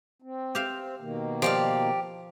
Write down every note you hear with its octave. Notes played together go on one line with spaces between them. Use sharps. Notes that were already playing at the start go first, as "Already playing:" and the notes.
C4
G4 E5 F5
B2 D#3 A#3
F3 G4 D5 F5